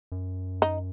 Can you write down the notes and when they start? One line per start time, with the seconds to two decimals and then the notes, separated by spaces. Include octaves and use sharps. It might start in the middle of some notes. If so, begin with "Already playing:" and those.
0.12 F#2
0.62 D#4